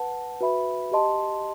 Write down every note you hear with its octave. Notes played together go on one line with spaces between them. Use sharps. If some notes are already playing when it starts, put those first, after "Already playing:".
Already playing: B4 F#5 A5
F#4 B4 E5 B5
G4 D#5 A5 C6